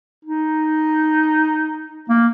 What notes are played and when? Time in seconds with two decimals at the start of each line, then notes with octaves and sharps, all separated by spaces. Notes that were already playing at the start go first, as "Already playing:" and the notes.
0.25 D#4
2.09 A#3